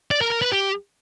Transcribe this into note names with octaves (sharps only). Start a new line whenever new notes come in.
D5
A#4
A#4
B4
G4